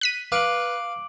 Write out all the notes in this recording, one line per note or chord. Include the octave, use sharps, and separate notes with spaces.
F#6 B6 D#7
B4 F5 D6 D7 F#7